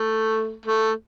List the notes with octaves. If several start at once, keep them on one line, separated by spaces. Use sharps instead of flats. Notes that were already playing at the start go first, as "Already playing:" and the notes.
Already playing: A3
A3